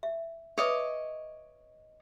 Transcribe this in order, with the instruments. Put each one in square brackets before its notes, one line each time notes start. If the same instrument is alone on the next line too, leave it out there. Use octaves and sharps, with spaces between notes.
[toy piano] E5
[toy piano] B4 E5 [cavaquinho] C#5 D#5 D6